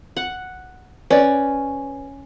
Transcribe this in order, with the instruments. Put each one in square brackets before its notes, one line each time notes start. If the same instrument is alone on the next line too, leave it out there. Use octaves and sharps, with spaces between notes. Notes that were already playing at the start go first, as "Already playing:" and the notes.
[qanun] F#5
[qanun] C#4 [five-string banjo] B4 D5